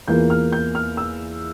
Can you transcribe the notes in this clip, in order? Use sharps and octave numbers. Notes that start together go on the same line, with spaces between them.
E2 E3 A#3 F4 G6
F6
G6
F6
E6